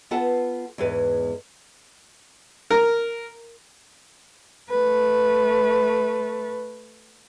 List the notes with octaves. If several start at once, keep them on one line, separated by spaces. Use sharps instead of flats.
B3 F4 A4 B4 F#5 A5
E2 G#2 G#3 B4
A#4
A3 B4